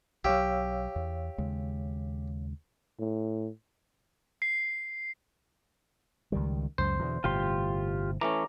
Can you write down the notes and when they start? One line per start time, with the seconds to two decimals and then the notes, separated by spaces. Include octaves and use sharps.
0.25 B1 F#3 G4 C#5 F5 E6
0.96 E2
1.38 D#2 C#3 G#3
2.99 A2
4.42 C7
6.32 C#2 D#3 G3
6.78 C#2 F#2 C5
6.99 E2 B2 D3
7.24 G1 A2 C3 F4 G4 C6
8.21 E3 A3 C#4 A#5 D6